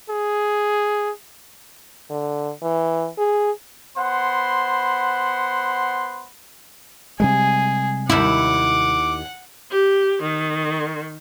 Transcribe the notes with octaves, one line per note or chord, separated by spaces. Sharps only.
G#4
D3
E3
G#4
B3 C5 F#5 B5 C6
C3 G3 G#3 G#4
D#2 E4 F#5 D6
G4
D#3